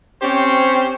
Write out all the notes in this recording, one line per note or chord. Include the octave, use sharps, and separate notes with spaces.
C4 C#4 G4 C5 C#5